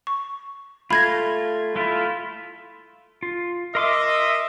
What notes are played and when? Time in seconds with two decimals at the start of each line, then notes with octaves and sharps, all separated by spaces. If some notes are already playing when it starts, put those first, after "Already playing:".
0.07 C#6
0.90 A3 F4 B5 G#6 A#6
1.76 A3 E4 F4
3.23 F4
3.75 A#4 D#5 E5 C6 D6